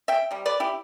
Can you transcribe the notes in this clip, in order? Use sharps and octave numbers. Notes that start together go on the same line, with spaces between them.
E5 G5
C3 G3
B4 D5
E4 G4